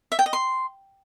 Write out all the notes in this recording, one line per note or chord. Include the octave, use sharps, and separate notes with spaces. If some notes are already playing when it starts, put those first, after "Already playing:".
E5
G5
D#5
C6